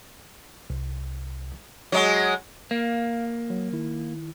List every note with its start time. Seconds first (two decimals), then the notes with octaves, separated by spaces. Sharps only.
0.70 C2
1.92 F#3 G#3
2.71 A#3 F5
3.50 F#3
3.73 D#3 E4